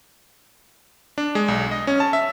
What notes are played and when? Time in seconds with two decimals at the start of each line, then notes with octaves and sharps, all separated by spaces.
1.18 D4
1.35 G#3
1.48 B1
1.71 D#5
1.87 C#4
2.00 A5
2.13 E5